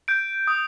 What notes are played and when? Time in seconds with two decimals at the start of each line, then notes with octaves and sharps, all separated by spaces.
0.08 G6 D7
0.47 D#6